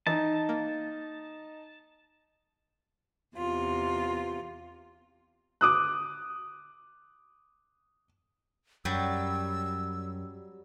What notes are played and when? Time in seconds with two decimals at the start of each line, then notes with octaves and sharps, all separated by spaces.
0.07 E3 D#4 A5
0.49 A#3
3.35 E2 C3 F4
5.61 D6 D#6 F#6
8.85 F#2 F#3 G3 E6